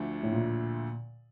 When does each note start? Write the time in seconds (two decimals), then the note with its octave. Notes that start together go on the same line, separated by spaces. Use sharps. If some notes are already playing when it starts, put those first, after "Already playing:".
Already playing: D2 D3 F3 A3 D4
0.23 A2
0.33 A#2